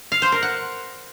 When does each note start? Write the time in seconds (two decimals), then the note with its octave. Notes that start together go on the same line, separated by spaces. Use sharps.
0.12 F5
0.22 C5
0.32 A#4
0.43 F#5